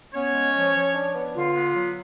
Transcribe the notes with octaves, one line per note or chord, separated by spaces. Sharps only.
B3 C#4 C#5
G#3
F3
F3
D4
B3
D3 F4
B3
F#3